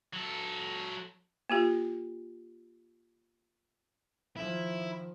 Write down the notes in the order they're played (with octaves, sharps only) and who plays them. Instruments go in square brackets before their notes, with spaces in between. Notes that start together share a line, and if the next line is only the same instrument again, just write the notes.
[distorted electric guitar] F#3 A4
[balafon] A#3 F4 G4
[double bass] D#3 F3 [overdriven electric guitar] E4